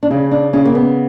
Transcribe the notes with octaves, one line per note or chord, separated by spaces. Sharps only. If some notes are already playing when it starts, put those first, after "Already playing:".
D4
C#3 C#4
D4
C#3 C#4
A#3
B3